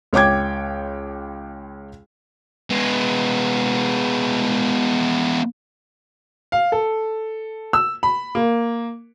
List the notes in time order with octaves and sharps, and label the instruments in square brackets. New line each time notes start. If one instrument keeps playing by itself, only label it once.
[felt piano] C#2 C#5 G5 D6 G#6
[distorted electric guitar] G#3 B3
[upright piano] F5
A4
E6
B5
A#3